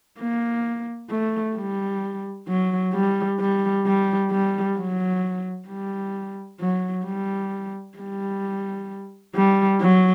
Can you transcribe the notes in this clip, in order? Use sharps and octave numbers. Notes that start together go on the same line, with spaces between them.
A#3
A3
G3
F#3
G3
G3
G3
G3
F#3
G3
F#3
G3
G3
G3
F#3